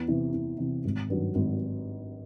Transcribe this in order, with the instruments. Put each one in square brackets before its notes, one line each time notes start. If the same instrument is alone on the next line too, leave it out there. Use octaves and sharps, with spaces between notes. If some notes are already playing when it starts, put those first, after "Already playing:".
Already playing: [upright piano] E2
C3 E3
E2
C3 E3
G#1
G2 D#3 F#3
G#1